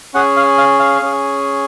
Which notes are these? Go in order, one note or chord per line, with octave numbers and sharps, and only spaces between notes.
C#4 G#4 F#5
F5
F5
F5
C#4 G#4